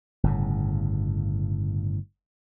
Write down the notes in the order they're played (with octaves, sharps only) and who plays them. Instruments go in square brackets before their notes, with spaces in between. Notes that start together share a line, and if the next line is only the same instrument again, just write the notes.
[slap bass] G1 A2 C#3